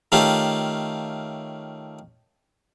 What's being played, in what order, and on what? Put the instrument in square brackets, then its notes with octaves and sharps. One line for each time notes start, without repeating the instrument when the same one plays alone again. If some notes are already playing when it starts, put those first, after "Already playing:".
[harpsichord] D#3 A3 C#4 F4 G4